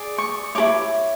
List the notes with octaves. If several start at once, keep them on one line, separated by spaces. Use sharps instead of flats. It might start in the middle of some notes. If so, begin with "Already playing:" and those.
Already playing: G#4 D5
C#6
E4 A4 C#5 D6